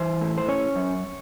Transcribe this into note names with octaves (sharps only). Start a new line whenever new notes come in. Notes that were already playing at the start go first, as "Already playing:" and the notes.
Already playing: E3 C5
A2
C5
C#4 C#5
F#2